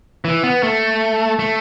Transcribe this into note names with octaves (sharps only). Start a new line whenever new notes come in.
E3
B3
A3
A3